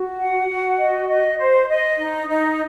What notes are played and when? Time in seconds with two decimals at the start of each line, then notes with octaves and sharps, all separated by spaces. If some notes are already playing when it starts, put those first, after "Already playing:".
Already playing: F#4
0.18 F#5
0.48 F#4
0.79 D#5
1.08 D#5
1.38 C5
1.69 D#5
1.99 D#4
2.29 D#4